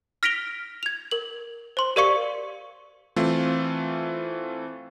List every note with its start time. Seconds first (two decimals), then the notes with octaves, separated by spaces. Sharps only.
0.23 F6 A#6 B6 D7 F7 G7
0.83 G#6 F7
1.11 A#4 F#7
1.77 C5 C6
1.96 G4 A#4 D5 F5 C#6 C#7
3.16 E3 A3 C4 F4